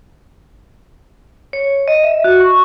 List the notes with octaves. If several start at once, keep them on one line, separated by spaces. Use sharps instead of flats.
C#5
D#5
E5
F#4
C#6